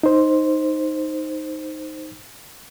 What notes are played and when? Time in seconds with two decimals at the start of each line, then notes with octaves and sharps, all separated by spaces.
0.03 D#4 C5